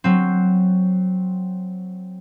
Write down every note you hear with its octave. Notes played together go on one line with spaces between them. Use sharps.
F#3 C4